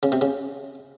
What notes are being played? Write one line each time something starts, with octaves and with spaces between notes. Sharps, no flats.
C#3
C3
C#3